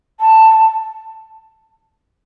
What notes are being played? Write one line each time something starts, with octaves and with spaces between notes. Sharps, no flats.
A5